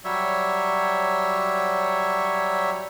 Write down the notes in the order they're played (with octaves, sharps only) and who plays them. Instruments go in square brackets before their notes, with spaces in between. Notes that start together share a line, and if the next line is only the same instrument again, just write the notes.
[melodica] F#3 G3 C#5 E5